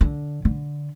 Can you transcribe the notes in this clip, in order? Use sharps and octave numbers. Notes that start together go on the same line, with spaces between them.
D3
D3